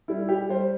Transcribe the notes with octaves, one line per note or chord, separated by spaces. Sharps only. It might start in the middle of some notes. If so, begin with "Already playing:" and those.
G3 E4
G4
G3 C5